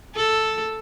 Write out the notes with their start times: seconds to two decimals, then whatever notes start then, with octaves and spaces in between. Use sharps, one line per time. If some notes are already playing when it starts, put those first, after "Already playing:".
0.16 A4